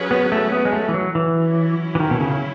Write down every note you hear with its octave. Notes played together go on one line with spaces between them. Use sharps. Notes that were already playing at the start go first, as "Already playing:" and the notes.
Already playing: F#3 C#4 G#4 B4
B3
A3
B3
G#3
A3
E3
F#3
E3
F#3 C#4 E4
E3
D#3
B2
C#3